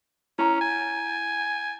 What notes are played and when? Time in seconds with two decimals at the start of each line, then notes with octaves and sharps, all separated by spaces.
0.39 C#4 E4 A#5
0.61 G#5